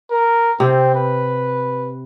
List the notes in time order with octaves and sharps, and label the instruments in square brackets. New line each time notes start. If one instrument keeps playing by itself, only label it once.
[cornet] A#4
[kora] C3 [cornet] C4
[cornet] B4